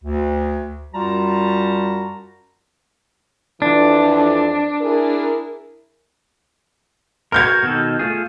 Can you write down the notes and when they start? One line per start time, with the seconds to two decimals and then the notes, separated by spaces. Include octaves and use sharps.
0.04 D2
0.95 F#2 G3 F4 F#4 A5 A#5
3.62 F2 E3 D4
4.82 E4 G#4 A#4
7.32 F#4 A#4 F6 G6 G#6
7.63 B2 D#3 A4
7.99 A3 F4 G#4